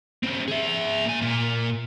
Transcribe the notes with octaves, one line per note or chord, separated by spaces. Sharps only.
C#3 C4
G#4 E5
A#2 G#5
A#2 A#3